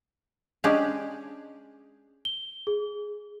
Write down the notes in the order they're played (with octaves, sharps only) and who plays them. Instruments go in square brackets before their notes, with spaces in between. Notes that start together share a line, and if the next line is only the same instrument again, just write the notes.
[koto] G#3 C#4 D4 G4 G#4
[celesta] G7
G#4